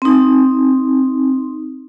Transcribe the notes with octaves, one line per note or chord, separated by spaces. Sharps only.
C4 D#4